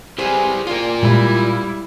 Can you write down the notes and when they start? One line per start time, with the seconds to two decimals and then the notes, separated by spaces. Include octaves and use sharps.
0.18 G#3 E4 G4 G#4 B4 C5
0.67 C#4 F4 A#4 D5 G5
1.03 A#2 G3 G#3 E4